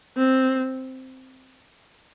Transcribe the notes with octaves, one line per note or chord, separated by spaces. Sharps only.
C4